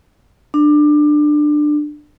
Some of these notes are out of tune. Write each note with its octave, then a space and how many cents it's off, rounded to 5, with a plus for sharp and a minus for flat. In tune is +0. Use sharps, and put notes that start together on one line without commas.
D4 +20